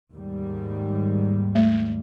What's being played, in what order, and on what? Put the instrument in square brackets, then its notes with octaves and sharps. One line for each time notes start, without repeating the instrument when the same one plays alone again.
[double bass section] D#2 G#2 G3
[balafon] A3